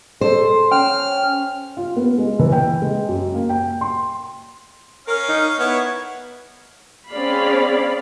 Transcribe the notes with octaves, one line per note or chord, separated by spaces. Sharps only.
A4 C5
C#4 G5 F6
F4
B3
G#3
E3
G5
G#3
F#2
A#3
G5
C6
C#4 A#4 F5
D#4
B3 E4 C#5
C4 C#4 G#4 D5 F5 B5